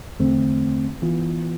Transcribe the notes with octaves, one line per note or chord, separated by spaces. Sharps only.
E2 D3 A3 C4
E3 B3 F4